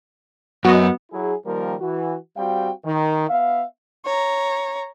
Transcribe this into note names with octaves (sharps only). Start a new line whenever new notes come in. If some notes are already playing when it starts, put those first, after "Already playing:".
F#2 B3 F#4 D#5
F#3 E4 G#4
D#3 F3 G3 A#3 A#4
E3 F#4
G3 C4 F#4 F5 G5
D#3
B3 E5 F5
C#5 A#5